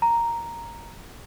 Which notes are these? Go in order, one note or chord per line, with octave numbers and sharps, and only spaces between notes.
A#5